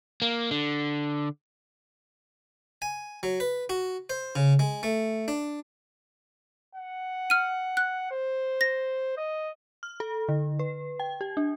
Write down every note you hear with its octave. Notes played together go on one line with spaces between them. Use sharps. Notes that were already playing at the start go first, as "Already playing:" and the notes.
A#3
D3
G#5
F#3
B4
F#4
C5
C#3
G#3
A3
D4
F#5
F6 D#7
F#6
C5
A#6
D#5
F6
A4
D3
B4
G5
G4
D4